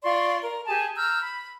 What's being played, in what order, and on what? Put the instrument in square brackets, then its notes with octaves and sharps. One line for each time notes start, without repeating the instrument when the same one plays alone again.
[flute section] F4 D5 C6 C#6
A#4
G4 G#4 G#5 A5
A#5 E6 F6 G6
B5